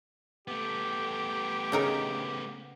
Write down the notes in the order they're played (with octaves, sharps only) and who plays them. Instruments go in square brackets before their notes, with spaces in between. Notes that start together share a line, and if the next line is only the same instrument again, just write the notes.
[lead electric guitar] A3 B3 [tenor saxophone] G4
[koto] C#3 D#4 A#4